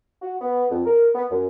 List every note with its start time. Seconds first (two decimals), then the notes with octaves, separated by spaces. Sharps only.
0.22 F#4
0.41 B3
0.71 F2
0.85 A#4
1.15 B3
1.31 F#2